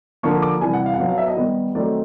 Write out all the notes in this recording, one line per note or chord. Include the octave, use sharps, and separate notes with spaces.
D3 F3 A#3 C#6
D6
C3 E3 G3 G#5
F#5
F5
F#5
B2 F#3 B3 F5
F5
E5
D#5
D#3 G3 B3
D#3 F#3 A3 C4 D#4 D5